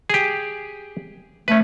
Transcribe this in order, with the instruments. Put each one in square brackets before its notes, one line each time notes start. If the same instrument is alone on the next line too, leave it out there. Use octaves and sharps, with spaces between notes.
[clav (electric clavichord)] G4 G#4
[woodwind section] A3 [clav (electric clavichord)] C#4 B4